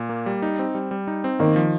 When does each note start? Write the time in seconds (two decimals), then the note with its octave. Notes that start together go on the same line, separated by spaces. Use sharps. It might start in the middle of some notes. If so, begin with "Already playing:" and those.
Already playing: A#2
0.09 A#3
0.26 G3
0.42 D#4
0.59 C4
0.75 G3
0.91 G3
1.07 D#4
1.24 C4
1.39 D#3 A#3
1.56 F3